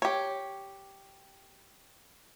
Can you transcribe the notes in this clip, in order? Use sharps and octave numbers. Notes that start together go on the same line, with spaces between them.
G4 C#5